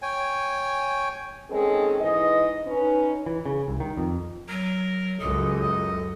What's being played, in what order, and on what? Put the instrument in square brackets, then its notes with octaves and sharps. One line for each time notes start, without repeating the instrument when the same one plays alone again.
[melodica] C#5 G5 G#5
[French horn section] D#3 G#3 C4 C#4 G#4 A4
G#2 E3 D#5
C#4 D#4 B4
[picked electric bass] E3
C#3
C2
D#3
F2
[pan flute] F#3 [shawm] A#4
[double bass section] C#2 F#2 [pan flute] A4 [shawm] D#5
[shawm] D#5